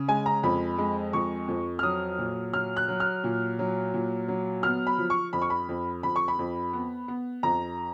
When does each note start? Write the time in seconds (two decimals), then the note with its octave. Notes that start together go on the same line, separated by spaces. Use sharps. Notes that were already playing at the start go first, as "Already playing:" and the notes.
Already playing: C#3
0.08 G#3 G#5
0.26 A#5
0.43 F2 B5
0.78 G#3
1.13 F2 C#6
1.48 F2
1.79 F6
1.83 F#3 D#6
2.18 A#2
2.53 F#3 F6
2.77 F#6
2.88 F#3
3.00 F6
3.24 A#2
3.59 F#3
3.94 A#2
4.28 F#3
4.63 B3 F6
4.87 B5
4.98 F3
5.10 C#6
5.33 F2 B5
5.42 C#6
5.50 B5
5.69 F2
6.03 F2 B5
6.16 C#6
6.28 B5
6.39 F2
6.73 B3
7.08 B3
7.43 F2 A#5